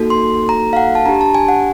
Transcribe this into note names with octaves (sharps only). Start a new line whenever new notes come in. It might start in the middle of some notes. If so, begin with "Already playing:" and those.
Already playing: A#3 D#4 F#4 A4
C6
A#5
F5
F#5
A5
D4 G4 A#5
A5
G#5
F#5